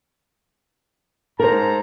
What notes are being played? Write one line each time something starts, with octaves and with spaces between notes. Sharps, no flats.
G#2 A#4 C5 A5 A#5